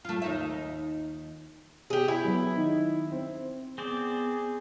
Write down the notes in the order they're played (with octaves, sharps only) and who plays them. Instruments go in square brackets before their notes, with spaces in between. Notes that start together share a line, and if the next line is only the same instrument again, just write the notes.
[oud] A3 F4
D#2 D#4 E5
[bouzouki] G4 G#4
E4
[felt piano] F#3 B3
D#3 D#4
C4
[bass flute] B3 [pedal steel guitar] C4 C5 D5 [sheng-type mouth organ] G#4